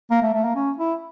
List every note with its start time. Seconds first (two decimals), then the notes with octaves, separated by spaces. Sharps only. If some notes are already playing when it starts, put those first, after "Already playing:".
0.11 A#3
0.22 A3
0.34 A3
0.44 A#3
0.55 C#4
0.78 E4